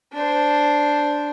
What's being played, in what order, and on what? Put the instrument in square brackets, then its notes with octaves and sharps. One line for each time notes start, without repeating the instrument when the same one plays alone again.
[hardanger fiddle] D4 C5